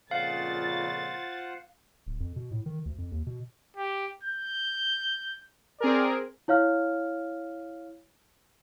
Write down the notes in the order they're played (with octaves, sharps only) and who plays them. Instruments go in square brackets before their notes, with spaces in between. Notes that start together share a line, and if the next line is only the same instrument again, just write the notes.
[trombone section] F2 A#2 C#3 [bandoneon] F4 C5 F#5 [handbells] F5 [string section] A6
[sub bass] D1
F2
B2
A2
D#3
D2
F2
D#2
B2
[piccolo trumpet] G4
G6
[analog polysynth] C4 G#4 A#4 [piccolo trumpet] D5
[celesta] E4 C#5 F5 F6